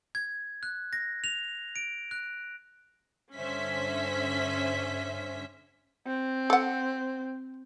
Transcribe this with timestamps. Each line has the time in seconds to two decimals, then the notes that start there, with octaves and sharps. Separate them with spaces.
0.15 G#6
0.63 F#6
0.93 A#6
1.24 F7
1.76 D7
2.11 F#6
3.36 G2 D3 C#4 C5 E5 B6
6.07 C4
6.50 A4 F#5